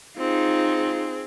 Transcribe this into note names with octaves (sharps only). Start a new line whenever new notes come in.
C4 D#4 F4 G#4